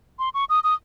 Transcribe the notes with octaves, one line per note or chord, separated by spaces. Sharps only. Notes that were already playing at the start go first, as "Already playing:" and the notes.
C6
C#6
D#6
D#6